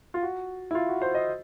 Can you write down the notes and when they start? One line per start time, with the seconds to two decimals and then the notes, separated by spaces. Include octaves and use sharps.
0.14 F4
0.23 F#4
0.71 E4
0.75 F4
0.88 F#4
1.02 C5
1.15 D#5